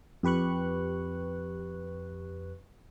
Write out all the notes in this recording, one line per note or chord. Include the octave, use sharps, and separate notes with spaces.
F2 G4 B4 C#6 F#6